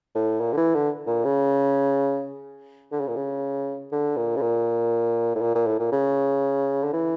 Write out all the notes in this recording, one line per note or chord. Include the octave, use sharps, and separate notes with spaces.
A2
A#2
D3
E3
D3
A#2
C#3
D3
C#3
A#2
C#3
D3
A#2
C#3
A#2
A2
A#2
A#2
A2
A#2
C#3
D3
E3